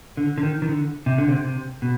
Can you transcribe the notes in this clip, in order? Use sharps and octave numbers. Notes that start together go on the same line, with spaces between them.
D3
D3
D#3
D#3
D3
C3
D3
C3
C3
B2